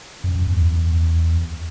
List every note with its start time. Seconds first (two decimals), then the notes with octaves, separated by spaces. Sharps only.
0.24 F#2
0.35 F#2
0.47 E2